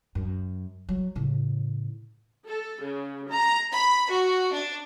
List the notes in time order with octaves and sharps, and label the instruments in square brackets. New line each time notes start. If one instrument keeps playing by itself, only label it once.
[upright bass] F#2
F#3
A2 C#3
[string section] A4
C#3
A#5
B5
F#4
D4